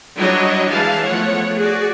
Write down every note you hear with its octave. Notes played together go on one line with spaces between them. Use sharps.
F#3 G3 D4 E4 C#5 D#5
E3 G#3 E4 F5 A5
F3 A3 B3 C#5 F#5
F#4 G#4 D5